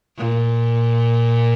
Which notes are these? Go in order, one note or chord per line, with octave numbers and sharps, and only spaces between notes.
A#2